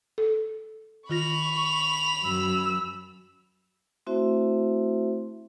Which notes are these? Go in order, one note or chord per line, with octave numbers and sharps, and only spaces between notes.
A4
D#3 F4 B5 C#6 A#6 F7
F#2 E6
A3 C4 E4 F#4 C5 E5